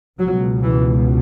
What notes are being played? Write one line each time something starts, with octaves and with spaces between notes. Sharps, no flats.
C#2 B2 F#3
E3